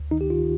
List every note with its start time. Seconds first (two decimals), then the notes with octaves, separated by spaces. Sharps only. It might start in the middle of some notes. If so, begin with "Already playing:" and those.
Already playing: D2
0.11 D#3 D#4
0.21 G4
0.30 D#3 F4